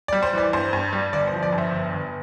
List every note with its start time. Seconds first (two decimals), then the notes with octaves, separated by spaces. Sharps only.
0.08 D5
0.13 G3
0.23 C5
0.33 E3 D5
0.53 G2 C5
0.73 G2
0.93 G3
1.13 G1 D5
1.27 C5
1.33 F3
1.43 D5
1.52 G2
1.58 C5 E5
1.72 G1
1.93 G1